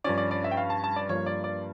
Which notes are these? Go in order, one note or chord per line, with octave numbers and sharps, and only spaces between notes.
G2 F3 C#4 D5
D5
D5
E5
G5
F5
A5
A5
D5
G2 F3 A#3 C#5
D5
D5